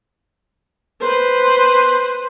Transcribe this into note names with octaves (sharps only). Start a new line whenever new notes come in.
B4 C5